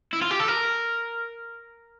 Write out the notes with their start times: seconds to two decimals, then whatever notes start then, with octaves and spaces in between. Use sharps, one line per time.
0.13 E4
0.22 F4
0.31 G4
0.39 A4
0.48 A#4